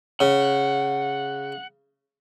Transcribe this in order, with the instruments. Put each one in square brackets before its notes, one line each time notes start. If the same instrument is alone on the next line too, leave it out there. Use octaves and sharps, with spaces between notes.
[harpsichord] C#3 [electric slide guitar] F#5